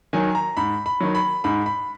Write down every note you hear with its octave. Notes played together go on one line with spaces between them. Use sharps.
D#3 F#3 G#5
A#5
G#2 B5
B5
D#3 F#3
B5
G#2 B5
B5